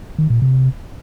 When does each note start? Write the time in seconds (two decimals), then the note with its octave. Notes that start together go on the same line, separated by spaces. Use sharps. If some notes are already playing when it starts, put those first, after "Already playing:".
0.18 D#3
0.30 A#2
0.42 C3